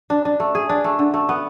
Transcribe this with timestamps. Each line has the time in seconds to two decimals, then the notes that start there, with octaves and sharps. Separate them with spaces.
0.10 D4
0.25 D4
0.40 A3
0.55 G#4
0.69 D4
0.84 A3
0.99 D3
1.14 A3
1.29 B3